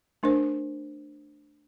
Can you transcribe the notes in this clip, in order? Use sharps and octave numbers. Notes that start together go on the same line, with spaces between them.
A3 D4 A#4 C5